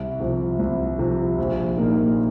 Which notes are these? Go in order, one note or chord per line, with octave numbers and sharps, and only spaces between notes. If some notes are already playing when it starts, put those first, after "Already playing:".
Already playing: C2
C3 F3
C2
C3 F3
A#1
A#2 A#3 D#4